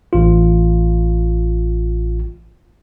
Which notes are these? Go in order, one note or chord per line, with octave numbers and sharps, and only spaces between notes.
A1 F4